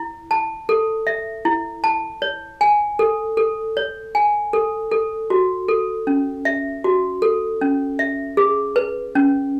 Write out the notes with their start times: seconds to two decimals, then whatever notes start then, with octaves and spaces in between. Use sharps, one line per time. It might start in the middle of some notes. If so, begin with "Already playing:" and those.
Already playing: E4
0.31 A5
0.69 A4
1.07 E5
1.45 E4
1.84 A5
2.22 C#5
2.61 G#5
2.99 A4
3.37 A4
3.77 C#5
4.15 G#5
4.53 A4
4.91 A4
5.30 F#4
5.69 A4
6.07 C#4
6.45 E5
6.84 F#4
7.22 A4
7.61 C#4
7.99 E5
8.37 G#4
8.76 B4
9.15 C#4